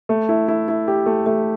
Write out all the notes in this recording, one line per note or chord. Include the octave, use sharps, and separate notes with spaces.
A3
E4
E4
E4
G4
A3
A3